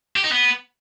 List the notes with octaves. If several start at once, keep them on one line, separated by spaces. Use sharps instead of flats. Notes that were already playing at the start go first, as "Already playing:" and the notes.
G4
D#4
B3